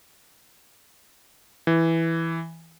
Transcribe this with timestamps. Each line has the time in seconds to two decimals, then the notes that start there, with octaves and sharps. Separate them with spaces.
1.67 E3